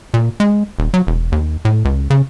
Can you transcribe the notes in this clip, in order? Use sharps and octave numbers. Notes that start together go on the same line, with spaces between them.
A#2
G#3
D#1
F#3
E1
D#2
A2
C#2
C#3